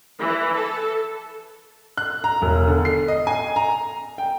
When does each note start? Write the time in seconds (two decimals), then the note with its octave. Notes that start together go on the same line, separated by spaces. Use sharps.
0.19 E3
0.55 A4
1.97 F#6
2.24 A#5
2.42 E1
2.67 D3
2.85 C7
3.08 D#5
3.27 G#5
3.56 A#5
4.18 G5